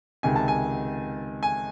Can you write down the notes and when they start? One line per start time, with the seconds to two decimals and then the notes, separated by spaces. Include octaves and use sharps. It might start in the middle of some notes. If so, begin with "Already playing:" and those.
0.23 C#2 C3 D#3 G#5
0.36 A5
0.48 G#5
1.43 G#5